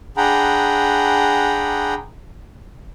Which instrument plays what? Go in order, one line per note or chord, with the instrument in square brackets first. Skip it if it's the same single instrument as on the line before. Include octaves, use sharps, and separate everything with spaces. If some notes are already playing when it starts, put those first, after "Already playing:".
[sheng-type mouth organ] D4 G#4 F#5 G5 A#5 B5